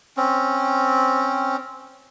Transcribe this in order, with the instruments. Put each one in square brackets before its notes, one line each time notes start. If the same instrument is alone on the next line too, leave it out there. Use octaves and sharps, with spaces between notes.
[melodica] C4 C#4